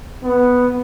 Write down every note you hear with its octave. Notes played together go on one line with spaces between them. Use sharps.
B3